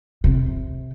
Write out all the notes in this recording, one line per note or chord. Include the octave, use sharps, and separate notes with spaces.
C3